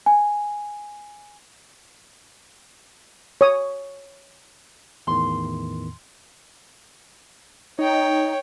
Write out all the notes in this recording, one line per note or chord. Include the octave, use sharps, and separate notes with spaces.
G#5
C#5 D#6
E2 A2 D#3 C6
D#4 C#5 G5